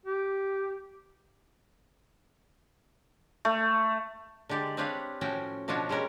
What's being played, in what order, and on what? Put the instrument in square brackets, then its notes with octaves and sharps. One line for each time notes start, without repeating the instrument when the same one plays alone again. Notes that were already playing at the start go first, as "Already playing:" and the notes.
[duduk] G4
[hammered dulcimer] A3
[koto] D3 G#3 G4 D5
C4 D4 G4 B4 C#5 F5
A2 F3 C#4 F#4 G5
B2 F3 D4 F4 F#4 C#5
G3 G#3 C#4 A#4 C#5